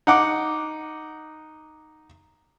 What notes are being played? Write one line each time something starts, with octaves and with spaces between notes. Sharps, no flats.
D#4 F#5 D6